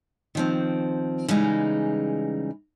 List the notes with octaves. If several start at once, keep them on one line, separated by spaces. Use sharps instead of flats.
D#3 F3 C4
C#3 E3 G3 G#3 D#4